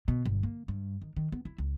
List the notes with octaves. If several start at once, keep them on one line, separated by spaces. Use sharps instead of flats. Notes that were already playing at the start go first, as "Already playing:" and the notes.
B2
G1
A#3
G2
D#3
D#3
B3
E4
C#2